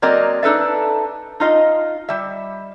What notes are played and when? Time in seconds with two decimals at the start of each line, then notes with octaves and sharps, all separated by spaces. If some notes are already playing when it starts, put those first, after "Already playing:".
0.02 F#3 A#3 C4 A#4 D5 D#5
0.43 D4 D#4 A4 B4 E5
1.40 D#4 F4 D#5
2.09 G3 E5